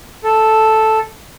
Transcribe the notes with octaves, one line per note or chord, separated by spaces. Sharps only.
A4